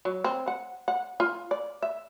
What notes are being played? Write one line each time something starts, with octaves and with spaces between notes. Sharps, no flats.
F#3
C4
F#5
F#5
F4
D5
E5